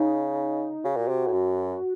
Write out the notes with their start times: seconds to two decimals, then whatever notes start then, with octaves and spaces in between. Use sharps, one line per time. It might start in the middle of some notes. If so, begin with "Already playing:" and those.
Already playing: C#3 D#4
0.84 C#3 F#4
0.96 A#2
1.08 C3
1.27 A2
1.33 F#2